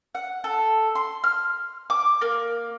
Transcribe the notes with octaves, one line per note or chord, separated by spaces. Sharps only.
F#5
A4
C6
F6
D6
A#3